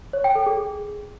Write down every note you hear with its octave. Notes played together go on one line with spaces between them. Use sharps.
C#5
G5
A4
G#4